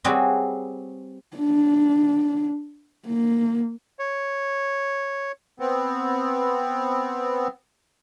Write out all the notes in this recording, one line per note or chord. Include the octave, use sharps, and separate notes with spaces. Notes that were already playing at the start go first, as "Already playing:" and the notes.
G3 C4 F#4 G#4 B4 C#5
D4
A#3
C#5
B3 C4